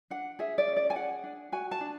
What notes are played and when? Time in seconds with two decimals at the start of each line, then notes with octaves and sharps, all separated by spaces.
0.10 D4 F#5
0.39 G#4 E5
0.58 D5
0.68 C#4
0.76 D5
0.90 G#5
0.96 G#4 F#5
1.24 D4
1.52 F#4 G#5
1.71 A5
1.81 D4